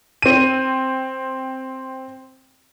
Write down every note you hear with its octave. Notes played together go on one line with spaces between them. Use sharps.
C4 D#7